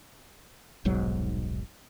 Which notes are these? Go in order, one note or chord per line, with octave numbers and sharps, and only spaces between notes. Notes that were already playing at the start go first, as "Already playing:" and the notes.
D#1 B1 G#2 F#3